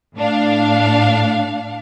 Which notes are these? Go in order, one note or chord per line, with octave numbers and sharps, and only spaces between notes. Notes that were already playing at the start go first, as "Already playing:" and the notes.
A2 D4 F5